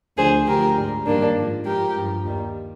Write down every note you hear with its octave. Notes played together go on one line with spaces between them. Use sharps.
D2 D3 F3 G#4 C5
D2 D3 F3 G4 A#4
G#2 G3
G#2 D#3 G3 A#3 D4
G#2 F3
G#2 F3 G4 A#4
G2 F3
D#2 D#3 G3